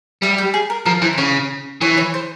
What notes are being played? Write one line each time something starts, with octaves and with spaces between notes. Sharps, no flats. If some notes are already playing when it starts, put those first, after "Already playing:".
G3 E5
G4
G#4
A#4
F3 A#4
E3 C5
C5
C#3 C#5
E3 C#5
C#5
C5